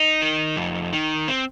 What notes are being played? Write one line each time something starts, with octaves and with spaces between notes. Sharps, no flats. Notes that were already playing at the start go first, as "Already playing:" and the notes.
Already playing: D#4
D#3
F2
D#3
C4